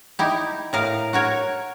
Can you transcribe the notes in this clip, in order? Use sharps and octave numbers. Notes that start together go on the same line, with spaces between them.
D#4 E4 G4
A2 A#4 F5
F#4 A#4 C#5